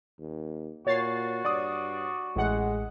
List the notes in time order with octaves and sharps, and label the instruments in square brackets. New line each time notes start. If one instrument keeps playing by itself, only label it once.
[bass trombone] D#2
[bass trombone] A#2 [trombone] F#4 [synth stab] C#5 A6 C7
[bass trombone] G2 [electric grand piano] D5 D6 D#6
[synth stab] A1 F#5 [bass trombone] G#3